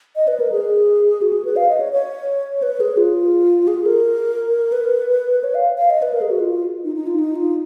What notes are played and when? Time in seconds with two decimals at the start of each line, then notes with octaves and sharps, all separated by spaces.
0.16 D#5
0.28 B4
0.40 A#4
0.52 G#4
1.22 F#4
1.33 G#4
1.45 B4
1.56 F5
1.69 D#5
1.80 C#5
1.92 C#5
2.62 B4
2.80 G#4
2.97 F4
3.68 G#4
3.86 A#4
4.72 B4
5.44 C#5
5.55 F5
5.78 F5
5.90 D#5
6.02 B4
6.14 A#4
6.21 G#4
6.30 F#4
6.40 F4
6.84 D#4
6.95 D#4
7.07 F4
7.19 D#4
7.36 F4